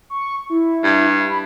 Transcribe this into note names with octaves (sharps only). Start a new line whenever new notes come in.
C#6
E4
G2
B5